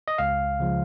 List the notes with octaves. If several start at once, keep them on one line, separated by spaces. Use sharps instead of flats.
D#5
C#2 F5
C#3 F3 G#3